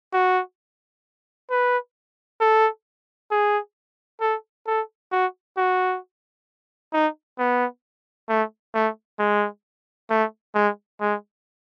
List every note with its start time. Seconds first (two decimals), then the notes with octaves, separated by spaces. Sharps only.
0.13 F#4
1.50 B4
2.41 A4
3.31 G#4
4.21 A4
4.67 A4
5.12 F#4
5.57 F#4
6.93 D#4
7.38 B3
8.29 A3
8.74 A3
9.19 G#3
10.10 A3
10.55 G#3
11.01 G#3